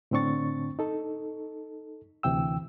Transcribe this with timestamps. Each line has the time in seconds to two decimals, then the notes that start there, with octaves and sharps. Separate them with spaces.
0.11 A2 D3 C4 D4 C#6 A6
0.79 D#4 A4
2.23 D2 C3 E3 G5 E6